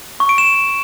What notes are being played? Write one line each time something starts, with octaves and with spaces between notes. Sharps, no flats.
C#6
D7
E7